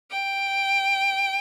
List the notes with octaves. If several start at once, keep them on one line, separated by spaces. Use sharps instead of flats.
G5